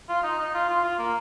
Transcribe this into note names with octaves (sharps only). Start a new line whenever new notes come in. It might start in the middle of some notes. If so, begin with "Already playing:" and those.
F4
D#4
D#4
F4
F4
F4
A#3